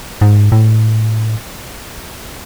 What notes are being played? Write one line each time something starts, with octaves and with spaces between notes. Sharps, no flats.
G#2
A2